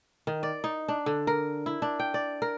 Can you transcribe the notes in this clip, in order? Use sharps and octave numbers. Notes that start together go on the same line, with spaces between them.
D#3
D5
D#4
D4
D3
A#4
E4
D4
G5
D5
A#4